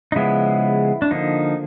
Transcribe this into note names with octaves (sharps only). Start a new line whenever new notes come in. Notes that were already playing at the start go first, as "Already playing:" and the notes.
D#4
C#3 F3 G#3 B3 E4
D4
D3 F3 A#3 D#4